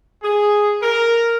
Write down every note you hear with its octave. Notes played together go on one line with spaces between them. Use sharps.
G#4
A#4